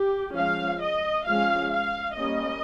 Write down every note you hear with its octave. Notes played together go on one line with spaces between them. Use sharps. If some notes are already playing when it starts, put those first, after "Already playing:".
Already playing: G4
F3 G#3 C#4 F5
D#5
F3 G#3 C#4 F5
F5
G3 A#3 C#4 D#5